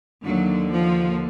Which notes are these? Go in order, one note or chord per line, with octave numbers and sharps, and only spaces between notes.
D#2 D3 F#3
F3